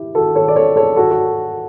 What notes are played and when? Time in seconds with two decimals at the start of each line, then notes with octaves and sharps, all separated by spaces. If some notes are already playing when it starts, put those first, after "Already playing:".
Already playing: E4 G4
0.15 F#4 A4
0.35 A4 C#5
0.48 D5
0.56 A4 C#5
0.76 A4 C#5
0.96 F#4 A4
1.11 F#4